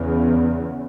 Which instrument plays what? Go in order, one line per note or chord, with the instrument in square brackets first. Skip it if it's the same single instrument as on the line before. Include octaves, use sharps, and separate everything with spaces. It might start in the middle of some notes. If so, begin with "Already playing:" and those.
Already playing: [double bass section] E2 C#3